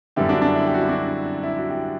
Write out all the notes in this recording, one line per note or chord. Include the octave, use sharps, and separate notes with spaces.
F#2 D3 G3 B3 E4 G4
D4 F#4
D4
E4
G4
F#4
E4
D4 F#4
E4
F#4
E4 G4